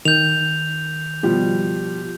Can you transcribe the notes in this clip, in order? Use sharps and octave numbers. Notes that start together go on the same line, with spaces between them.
D#3 G6 F7
B2 F3 G3